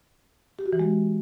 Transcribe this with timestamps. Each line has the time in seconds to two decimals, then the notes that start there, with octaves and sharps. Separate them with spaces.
0.59 G4
0.66 F#4
0.73 E3
0.80 G#3